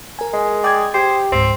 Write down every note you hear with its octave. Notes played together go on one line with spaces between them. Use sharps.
A#4 G#5
G#3
D5 G5 D#6 G#6
G4 C5
C#2 G#2 C4